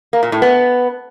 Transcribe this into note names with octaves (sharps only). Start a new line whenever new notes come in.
A#3
A#2
A2
B3